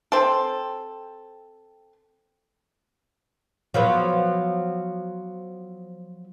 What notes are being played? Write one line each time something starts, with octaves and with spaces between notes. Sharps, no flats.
C4 A4
F3 F#3 B3